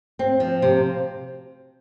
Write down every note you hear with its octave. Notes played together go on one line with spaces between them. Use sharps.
C4
F3
C3